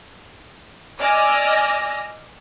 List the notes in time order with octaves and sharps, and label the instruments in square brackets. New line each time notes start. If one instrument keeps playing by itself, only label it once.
[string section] D5 D#5 G#5 E6 F6 A#6